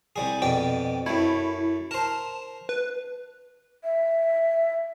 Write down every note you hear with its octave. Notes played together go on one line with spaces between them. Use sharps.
C2 G3 G#4
F2 B2 D5 G5
F#2 A3 E4
A#4 C5 A5
B4
E5